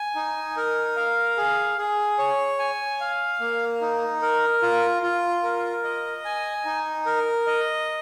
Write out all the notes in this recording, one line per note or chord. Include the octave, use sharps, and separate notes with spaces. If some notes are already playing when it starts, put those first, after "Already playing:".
Already playing: G#5
D#4
A#4
F5
G#4
G#4
C#5
G#5
F5
A#3
D#4
A#4
F4
F4
A#4
D#5
G#5
D#4
A#4
D#5